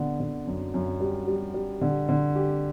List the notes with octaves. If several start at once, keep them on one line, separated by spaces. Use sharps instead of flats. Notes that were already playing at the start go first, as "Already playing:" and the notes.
Already playing: D3 B3
D3
F#2
F#2
G3
G3
G3
D3
D3
G4